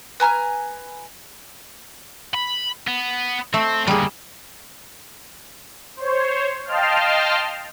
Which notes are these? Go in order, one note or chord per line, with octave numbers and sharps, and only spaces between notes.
B4 G#5 A#5 F6
B5
B3
A3 C4
D3 G3 A#3 G#4
C5 C#5
D#5 F5 G5 A5 C6 F6